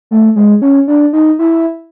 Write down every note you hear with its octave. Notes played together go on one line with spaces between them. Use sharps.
A3
G#3
C#4
D4
D#4
E4